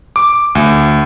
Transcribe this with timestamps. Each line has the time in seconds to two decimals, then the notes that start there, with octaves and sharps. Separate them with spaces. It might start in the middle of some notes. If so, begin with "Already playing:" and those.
0.16 D6
0.55 D2